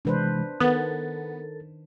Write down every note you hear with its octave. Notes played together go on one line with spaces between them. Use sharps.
C3 E3 G#3 D4 B4 C5
D#3 B3 A4 A#4 A6